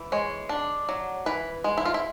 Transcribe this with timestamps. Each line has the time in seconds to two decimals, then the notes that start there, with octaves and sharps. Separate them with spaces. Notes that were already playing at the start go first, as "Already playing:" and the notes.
Already playing: E3
0.12 G#3 C#5
0.49 D4
0.89 F#3
1.26 E3 B4
1.64 G#3
1.78 E4
1.85 F4
1.94 E4